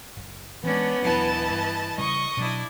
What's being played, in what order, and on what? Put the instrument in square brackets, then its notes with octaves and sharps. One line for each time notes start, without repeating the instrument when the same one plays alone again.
[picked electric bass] F#1
[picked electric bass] E3 G#3 [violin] B3 [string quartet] C#4 D4
[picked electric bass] D#1 F#3 D4 [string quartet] E3 D#5 A5
[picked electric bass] G2
[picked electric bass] C#3 G3 [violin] D#5 D#6 [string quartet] C#6
[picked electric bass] B2 F#3 [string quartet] D4 E4